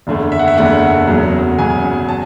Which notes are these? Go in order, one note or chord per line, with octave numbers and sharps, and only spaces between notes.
F#1 E2 D3 A3
E5
F#5
E5
F#1 E2 D3 A3 F#5
E1 E2 C#3 F#3
E1 E2 C#3 F#3 G#5
A5